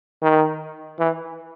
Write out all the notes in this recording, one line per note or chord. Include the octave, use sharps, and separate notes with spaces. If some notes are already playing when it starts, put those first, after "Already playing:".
D#3
E3